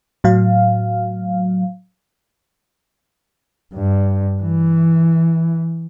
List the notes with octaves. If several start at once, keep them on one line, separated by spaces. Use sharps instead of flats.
A2 F#3 F5
G2
E3